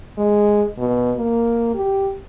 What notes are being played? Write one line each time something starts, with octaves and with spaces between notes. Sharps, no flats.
G#3
B2
A#3
G4